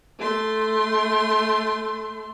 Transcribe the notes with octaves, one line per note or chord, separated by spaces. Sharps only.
A3 C6